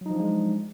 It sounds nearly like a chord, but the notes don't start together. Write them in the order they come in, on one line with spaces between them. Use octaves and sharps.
F#3 D#4 F3 D4 G#3